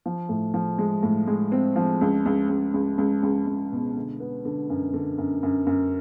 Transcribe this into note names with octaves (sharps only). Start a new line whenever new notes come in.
F3
A2
F3
G#3
A2
G#3
C4
F3
C#2
C#2
C#2
C#2
C#2
C#2
C#2
B2
D3
B3
D3
F#2
D3
F#2
F#2
F#2